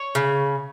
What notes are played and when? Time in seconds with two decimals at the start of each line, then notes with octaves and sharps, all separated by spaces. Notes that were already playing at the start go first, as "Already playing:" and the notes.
Already playing: C#5
0.15 C#3